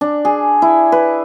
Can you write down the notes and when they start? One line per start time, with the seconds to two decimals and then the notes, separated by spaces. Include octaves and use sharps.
0.01 D4
0.25 G#4
0.62 E4
0.92 B4